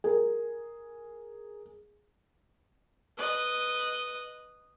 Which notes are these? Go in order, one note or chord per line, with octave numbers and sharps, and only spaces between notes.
G#4 A#4
B4 D#5